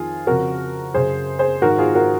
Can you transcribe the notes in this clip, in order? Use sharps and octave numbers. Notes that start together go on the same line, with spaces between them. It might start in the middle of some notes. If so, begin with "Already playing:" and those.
Already playing: F2 D#3 F4 G#4
F2 C#3 F#4 A#4
F#2 C#3 G#4 C5
G#4 C5
G#2 D#3 F#4 A#4
F4 G#4
F#4 A#4